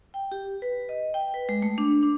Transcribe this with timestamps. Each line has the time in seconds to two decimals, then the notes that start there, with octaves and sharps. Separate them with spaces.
0.14 G5
0.32 G4
0.62 B4
0.89 D#5
1.14 G5
1.34 B4
1.49 G#3
1.62 A3
1.78 D4
2.03 D4